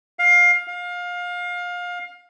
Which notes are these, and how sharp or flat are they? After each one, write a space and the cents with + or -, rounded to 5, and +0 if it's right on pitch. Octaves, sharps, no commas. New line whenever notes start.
F5 +20
F5 +25